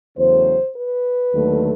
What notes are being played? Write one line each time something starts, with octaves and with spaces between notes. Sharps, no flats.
E2 C#3 F#3 A3 C5
B4
D#2 D3 F#3 A3